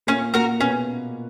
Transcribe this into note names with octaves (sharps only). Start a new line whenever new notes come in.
A#2 A#3 C#4
A#2 A#3 F#4 A#4
B2 B3 C#4